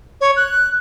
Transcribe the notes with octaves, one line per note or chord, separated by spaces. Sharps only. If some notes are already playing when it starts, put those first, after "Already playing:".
C#5
F#6